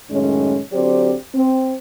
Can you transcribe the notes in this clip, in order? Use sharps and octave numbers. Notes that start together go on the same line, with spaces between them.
F#2 A2 D#3 G#3 C#4
D3 F#3 C4 G4 C5 D5
C4